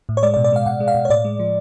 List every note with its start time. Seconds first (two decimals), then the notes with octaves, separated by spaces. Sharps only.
0.09 A2
0.17 C#5
0.23 G#3 D5
0.34 D5
0.37 B2
0.44 D5
0.52 G#3 F5
0.66 B2 F#5
0.80 G#3
0.88 F5
0.95 B2
1.05 C#5
1.10 A2 D5
1.25 G#3
1.39 F3